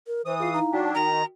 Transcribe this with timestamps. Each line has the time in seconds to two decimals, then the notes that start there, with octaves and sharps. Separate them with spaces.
0.07 A#4
0.26 E3 C5 D#6
0.40 F4 G#4 F5 C7
0.54 D#4 E4 F5 A#5
0.73 F#3 D4 F#4 G5 B6
0.95 D#3 A#5